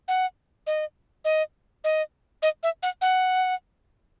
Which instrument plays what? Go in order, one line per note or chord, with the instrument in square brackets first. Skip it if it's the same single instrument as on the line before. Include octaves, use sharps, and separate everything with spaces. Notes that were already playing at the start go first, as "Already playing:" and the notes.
[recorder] F#5
D#5
D#5
D#5
D#5
E5
F#5
F#5